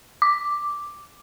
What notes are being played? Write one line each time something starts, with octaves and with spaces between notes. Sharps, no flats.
D6